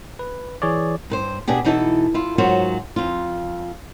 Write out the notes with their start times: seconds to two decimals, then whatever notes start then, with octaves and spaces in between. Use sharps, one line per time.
0.19 B4
0.62 E3 G#4 C#5 D5
1.10 G2 B4 C5
1.48 B2 B3 D4 G4 G#4
1.64 B2 E3 D#4 E4 A4
2.14 E4 F4
2.38 G#2 F#3 F4 F#4 A#4 C5
2.96 F2 F4